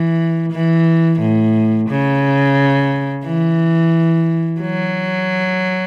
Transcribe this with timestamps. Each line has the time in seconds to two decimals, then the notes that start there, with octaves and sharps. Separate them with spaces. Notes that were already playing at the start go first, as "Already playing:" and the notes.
Already playing: E3
0.52 E3
1.20 A2
1.89 C#3
3.25 E3
4.61 F#3